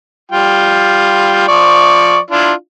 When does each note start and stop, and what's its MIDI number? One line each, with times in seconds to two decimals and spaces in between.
0.31 1.43 55
0.31 1.43 65
0.31 1.43 79
1.48 2.18 53
1.48 2.18 74
1.48 2.18 85
2.30 2.52 62
2.30 2.52 64
2.30 2.52 65